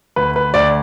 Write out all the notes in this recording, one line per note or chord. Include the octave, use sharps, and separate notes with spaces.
D2 B4
B4
D2 D5